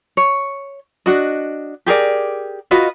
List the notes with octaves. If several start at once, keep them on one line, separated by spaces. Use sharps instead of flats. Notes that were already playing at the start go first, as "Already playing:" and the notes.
C#5
D4 F#4 D#5
G4 G#4 A#4 D5
F4 F#4 B4 D#5